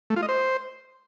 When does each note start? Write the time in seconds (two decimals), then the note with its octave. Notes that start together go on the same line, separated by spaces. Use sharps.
0.10 A3
0.16 F4
0.22 D#5
0.29 C5